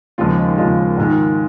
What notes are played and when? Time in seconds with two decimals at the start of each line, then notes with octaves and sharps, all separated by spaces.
0.18 D#2 C#3 F3 G#3 F4
0.38 D#4
0.57 D#2 C#3 F3 G#3 F4
0.97 G#2 D#3 G#3